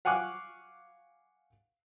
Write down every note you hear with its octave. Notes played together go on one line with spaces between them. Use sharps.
F5 F#5 G#5 C#6 D6 F#6